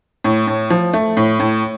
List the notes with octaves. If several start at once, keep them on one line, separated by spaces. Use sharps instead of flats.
A2
A2
F3
A3
A2
A2